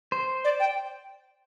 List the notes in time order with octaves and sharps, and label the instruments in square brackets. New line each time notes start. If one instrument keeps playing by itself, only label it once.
[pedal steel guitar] C5
[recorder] D5
G5